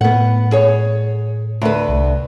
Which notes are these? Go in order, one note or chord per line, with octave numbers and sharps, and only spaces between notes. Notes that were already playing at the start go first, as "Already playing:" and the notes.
A2 B3 F#5
G#4 C#5
D2 B4
C2